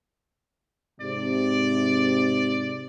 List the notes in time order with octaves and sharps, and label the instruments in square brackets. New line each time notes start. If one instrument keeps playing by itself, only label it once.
[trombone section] G#2 C3 [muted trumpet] D5